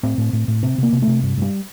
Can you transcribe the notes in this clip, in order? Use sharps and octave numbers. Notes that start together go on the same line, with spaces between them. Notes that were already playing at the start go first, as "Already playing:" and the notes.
A2 C4
A2
A2
A2
C3 C4
C3 A#3
C3
A3
C3
G2
G2 G3